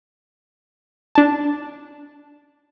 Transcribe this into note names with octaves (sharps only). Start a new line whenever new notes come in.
D4 A5